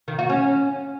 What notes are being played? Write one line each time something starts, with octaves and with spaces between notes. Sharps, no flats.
D#3
F#4
C#4